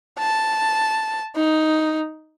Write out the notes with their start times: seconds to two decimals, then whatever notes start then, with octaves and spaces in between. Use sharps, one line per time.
0.19 A5
1.36 D#4